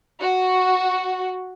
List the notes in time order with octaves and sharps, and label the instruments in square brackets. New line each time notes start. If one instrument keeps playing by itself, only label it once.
[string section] F#4